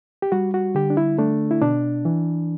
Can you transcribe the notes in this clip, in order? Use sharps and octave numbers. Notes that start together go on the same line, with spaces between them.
G4
G3 F#4
F#4
D3 G4
D4
E4
A3 D4
E4
B2 D4
E3